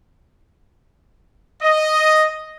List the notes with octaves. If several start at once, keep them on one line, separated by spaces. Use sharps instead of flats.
D#5